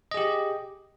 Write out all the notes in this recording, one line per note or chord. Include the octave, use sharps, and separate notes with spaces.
G4 G#4 D#5